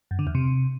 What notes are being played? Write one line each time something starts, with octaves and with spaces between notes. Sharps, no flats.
F#2
D3
E2
C3